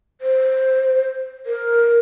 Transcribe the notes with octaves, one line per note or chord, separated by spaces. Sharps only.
C5
A#4